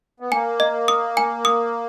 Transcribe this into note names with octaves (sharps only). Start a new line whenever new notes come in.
B3
A#3 G#5
D#5
D#6
G#5
D#6